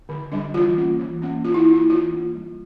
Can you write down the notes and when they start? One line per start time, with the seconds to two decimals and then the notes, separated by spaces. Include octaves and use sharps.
0.09 D3
0.32 G3 D4
0.54 E3 F4
0.77 A#3 C#4
0.99 E3
1.22 A#3 C#4
1.44 E3 F4
1.54 E4
1.67 A#3 D4
1.74 E4
1.90 E3 F4
2.12 A#3 D4
2.35 G3